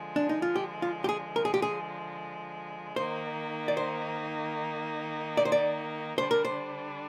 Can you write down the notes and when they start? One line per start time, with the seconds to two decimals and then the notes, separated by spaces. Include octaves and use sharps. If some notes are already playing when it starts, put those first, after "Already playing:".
Already playing: D3 F3 G#3
0.16 D4
0.29 D#4
0.42 F4
0.56 G4
0.82 F4
1.04 G4
1.09 G#4
1.36 A#4
1.45 G#4
1.54 G4
1.62 G#4
2.96 D#3 A#3 D#4 C5
3.68 D5
3.77 C5
5.37 D5
5.45 C5
5.52 D5
6.18 D3 G3 D4 C5
6.31 A#4
6.45 C5